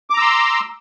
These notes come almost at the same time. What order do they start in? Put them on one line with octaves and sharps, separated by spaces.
D6 A#5 E6 C6